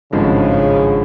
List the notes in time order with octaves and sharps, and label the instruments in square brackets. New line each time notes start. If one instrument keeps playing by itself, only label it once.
[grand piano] G#1 G2 F3 G#3 [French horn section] C#3